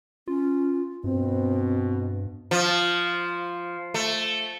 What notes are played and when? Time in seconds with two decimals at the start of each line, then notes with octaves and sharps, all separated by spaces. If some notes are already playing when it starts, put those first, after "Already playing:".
0.28 C#4 F4
1.04 G2 B2 C4
2.51 F3
3.94 A3